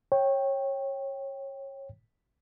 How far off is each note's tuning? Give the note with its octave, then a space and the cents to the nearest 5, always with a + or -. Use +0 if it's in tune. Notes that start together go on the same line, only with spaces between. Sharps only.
C#5 -20 G5 +0